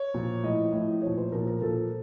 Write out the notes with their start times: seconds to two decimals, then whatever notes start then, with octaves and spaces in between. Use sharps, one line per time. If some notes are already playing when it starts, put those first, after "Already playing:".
Already playing: C#5
0.14 A#2 F3
0.43 A2 F3 D#5
0.72 A2 F3
1.02 A#2 F3 C#5
1.18 C5
1.32 A#2 F3 A#4
1.47 A#4
1.61 A#2 F3 A4